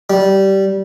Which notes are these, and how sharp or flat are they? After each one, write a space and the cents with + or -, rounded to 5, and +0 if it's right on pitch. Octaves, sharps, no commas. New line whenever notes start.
G3 -15